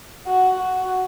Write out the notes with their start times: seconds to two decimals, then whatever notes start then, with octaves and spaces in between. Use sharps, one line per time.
0.27 F#4
0.60 F#4